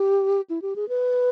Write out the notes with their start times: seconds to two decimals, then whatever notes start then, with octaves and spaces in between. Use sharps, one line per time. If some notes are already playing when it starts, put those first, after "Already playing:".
Already playing: G4
0.50 E4
0.62 G4
0.76 G#4
0.89 B4